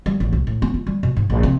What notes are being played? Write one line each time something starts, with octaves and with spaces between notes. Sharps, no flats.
G3
A1
C2
A2
B3
F4
G3
B2
G#2
A#1
C3